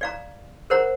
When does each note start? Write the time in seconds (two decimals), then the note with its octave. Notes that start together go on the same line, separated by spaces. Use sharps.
0.01 D5 F5 A#5
0.70 A#4 C5 F#5 A#5